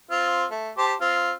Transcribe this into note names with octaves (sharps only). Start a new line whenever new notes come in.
C4 F4
A3
G4 C5 A5
C4 F4